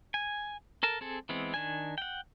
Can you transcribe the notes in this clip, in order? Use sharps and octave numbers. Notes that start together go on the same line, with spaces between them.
G#5
A4 A#4 A5
C4 G#4 A4
E3 G#3 B3 C4
D#3 D4 G#5
F#5 G5